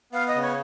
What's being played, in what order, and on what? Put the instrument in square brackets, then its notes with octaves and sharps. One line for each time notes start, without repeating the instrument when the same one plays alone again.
[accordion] B3 [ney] F5
[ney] D#5
[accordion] C#3
[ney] C#5